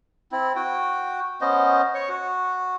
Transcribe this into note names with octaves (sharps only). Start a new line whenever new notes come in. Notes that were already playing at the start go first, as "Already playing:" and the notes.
C4 E4
F#4 G5
B3 C#4 C5 D#5
C#5 C#6
F#4